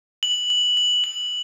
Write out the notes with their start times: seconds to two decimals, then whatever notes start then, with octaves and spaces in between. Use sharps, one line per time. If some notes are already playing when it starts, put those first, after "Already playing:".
0.23 F#7
0.50 F#7
0.77 F#7
1.04 F#7